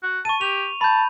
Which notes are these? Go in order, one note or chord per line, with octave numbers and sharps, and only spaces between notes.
F#4
A5 C#6 D#7
G4 F7
A5 B5 G6